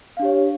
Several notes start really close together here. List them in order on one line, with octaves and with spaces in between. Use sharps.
F5 D4 G4 C#5